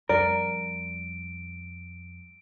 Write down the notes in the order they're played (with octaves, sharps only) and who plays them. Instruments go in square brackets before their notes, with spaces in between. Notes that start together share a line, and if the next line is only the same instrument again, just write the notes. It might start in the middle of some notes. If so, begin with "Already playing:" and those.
[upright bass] F2 G3 [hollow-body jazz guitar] A#4 [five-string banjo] D5 [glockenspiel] D7